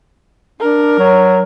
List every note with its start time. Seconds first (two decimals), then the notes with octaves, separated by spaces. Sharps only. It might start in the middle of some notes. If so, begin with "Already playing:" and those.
0.61 D4 A#4
0.99 F#3